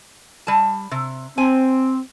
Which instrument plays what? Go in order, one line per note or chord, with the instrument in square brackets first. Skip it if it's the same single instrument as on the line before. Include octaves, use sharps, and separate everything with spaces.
[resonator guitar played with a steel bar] G3 A5
C3
[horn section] C4 [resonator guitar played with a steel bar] G#5